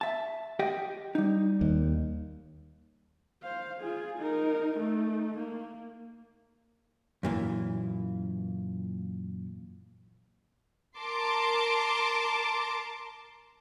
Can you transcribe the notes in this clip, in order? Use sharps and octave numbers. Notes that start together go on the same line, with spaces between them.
E5 A5
G4 D#5 G5
G3 D#4
D#2
C5 F5
F4 G#4
D#4 A#4
A3 D#4
A#3
F#2 A#2 E3
A#4 A5 A#5 C6 D6